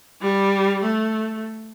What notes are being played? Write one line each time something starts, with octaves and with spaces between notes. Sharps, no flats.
G3
A3